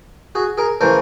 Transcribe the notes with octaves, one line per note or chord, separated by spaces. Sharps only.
F#4 G#4
G#4 A#4
C#3 E3 A3 A#4 C5